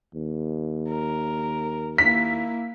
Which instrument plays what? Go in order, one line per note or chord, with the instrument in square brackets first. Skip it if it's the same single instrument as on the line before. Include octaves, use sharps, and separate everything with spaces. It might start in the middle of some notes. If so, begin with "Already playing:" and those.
[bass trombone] D#2
[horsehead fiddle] A#4
[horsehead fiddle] A#3 E4 [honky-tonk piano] B6